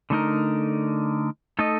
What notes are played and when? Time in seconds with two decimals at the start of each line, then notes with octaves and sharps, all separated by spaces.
0.10 D3 A3 D#4 A#4
1.59 A3 D#4 A4 D#5